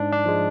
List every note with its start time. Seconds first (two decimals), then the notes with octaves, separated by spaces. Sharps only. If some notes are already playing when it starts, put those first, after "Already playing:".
Already playing: G#2 D4
0.12 D4
0.25 F3 G#3